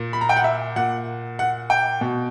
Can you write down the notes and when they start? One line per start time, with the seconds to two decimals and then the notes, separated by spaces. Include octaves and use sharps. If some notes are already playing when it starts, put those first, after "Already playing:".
Already playing: A#2
0.13 B5
0.21 A#5
0.29 G5
0.37 F#5
0.44 E5
0.76 A#2 F#5
1.39 F#5
1.70 G5
2.01 B2